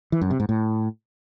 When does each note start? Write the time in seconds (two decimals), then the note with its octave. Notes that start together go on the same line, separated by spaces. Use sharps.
0.12 E3
0.21 F#2
0.31 C3
0.40 G#2
0.49 A2